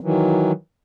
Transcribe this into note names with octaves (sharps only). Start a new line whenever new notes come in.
D#3 E3 F#3